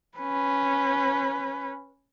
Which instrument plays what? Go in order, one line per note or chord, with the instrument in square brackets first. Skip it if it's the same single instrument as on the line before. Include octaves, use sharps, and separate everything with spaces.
[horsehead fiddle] C#4 B4